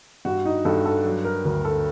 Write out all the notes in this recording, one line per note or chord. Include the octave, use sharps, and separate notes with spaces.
G2 F#4
D#4
G2 A4
A4
F#3
A#4
D2 A#4
A4